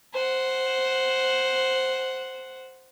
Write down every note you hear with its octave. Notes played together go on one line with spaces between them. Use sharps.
C5 F#5